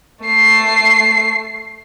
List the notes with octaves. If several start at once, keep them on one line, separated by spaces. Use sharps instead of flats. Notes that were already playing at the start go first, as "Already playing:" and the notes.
A3 C7